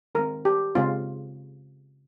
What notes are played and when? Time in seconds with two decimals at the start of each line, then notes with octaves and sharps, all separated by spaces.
0.15 D#3 G#3 C4 A#4
0.45 G4
0.75 C#3 G#3 C4 F4